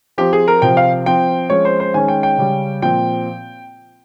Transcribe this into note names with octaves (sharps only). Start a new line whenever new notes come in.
F3 C4 G4
G#4
A#4
C3 F3 C4 G5
F5
F3 C4 G5
F3 G#3 C#4 C#5
C5
C5
D#3 G#3 C#4 G#5
G5
G5
C#3 G3 C#4
A#2 F3 C4 G5